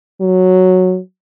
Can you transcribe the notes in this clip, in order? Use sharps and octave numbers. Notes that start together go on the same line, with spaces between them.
F#3